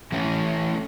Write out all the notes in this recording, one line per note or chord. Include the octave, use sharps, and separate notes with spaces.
E3 A3 C#4